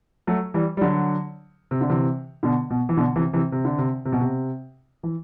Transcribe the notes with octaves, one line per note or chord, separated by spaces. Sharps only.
F#3 A3
E3 G3
G3
D3 F#3
C3
D3
C3 E3
B2 D3
B2
E3
B2 D3
C3 E3
C3 E3
C3
D3
C3
C3
B2
C3
E3